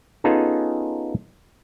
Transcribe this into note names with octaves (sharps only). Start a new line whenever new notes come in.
B3 C#4 D#4 F4 G#4 A4